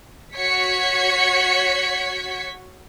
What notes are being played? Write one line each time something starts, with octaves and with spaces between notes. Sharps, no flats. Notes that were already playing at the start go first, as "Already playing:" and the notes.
F#4 C#5 G#6 B6 C#7